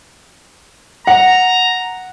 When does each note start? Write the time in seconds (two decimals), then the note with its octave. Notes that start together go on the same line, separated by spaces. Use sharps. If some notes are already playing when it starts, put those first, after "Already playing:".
1.07 F#5 A#5